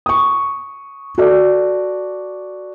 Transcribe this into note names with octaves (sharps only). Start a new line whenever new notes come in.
C#6 D#6
F#4 A4 D5